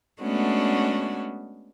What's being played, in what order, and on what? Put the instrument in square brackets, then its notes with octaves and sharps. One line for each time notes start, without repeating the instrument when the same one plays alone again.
[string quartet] G#3 A3 B3 C#4 D4 F#4